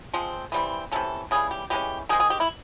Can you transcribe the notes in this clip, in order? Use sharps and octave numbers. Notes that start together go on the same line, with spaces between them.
F3 G#3 C4
E3 G3 C4
C3 E3 G#3 C#4 A4
C#3 E3 G3 G#4
G4
E3 G#3 C#4 G4
D#3 G#3 C4 G#4
G#4
G4
E4